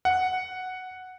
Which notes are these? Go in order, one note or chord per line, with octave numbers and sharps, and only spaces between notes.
F#5